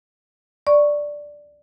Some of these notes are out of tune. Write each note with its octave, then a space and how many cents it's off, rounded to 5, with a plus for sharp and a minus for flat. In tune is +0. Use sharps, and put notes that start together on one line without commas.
D5 +0 C#6 +0